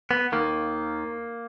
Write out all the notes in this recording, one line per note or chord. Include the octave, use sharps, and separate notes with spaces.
B3
D#2 D#3 A#3